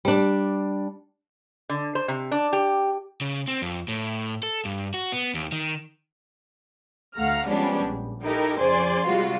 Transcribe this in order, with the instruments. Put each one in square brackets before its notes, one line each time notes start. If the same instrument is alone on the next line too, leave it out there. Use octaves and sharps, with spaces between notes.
[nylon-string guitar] G3 D4
[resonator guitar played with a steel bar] D3
C5
C3
D4
G4
[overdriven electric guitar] C#3
C4
F2
A2
A4
G2
F#4
B3
D#2
D#3
[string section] D2 A3 F5 F#5 A#5 F6
F3 G3 G#3 B3 C#4 D4
A#1
D#4 E4 G4 A4 A#4
F2 C#3 C5 D5 G#5 C6
C3 G3 G#3 F4 F#4